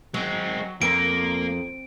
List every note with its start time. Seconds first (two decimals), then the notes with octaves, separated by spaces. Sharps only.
0.14 F#3 G#3 C4
0.82 F2 A#3 D7